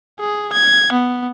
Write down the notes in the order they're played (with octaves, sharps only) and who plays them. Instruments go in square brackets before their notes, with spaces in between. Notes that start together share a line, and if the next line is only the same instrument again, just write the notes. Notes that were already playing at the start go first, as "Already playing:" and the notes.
[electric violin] G#4
G#6
B3